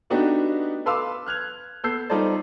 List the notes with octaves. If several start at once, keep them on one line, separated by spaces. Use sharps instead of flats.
A3 B3 D4 D#4 F#4 G4
A4 B4 F5 C6 D6 E6
F6 F#6 G#6 F7
B3 A4 E6 G6 C7
G3 D#4 F4 A4 C5 D5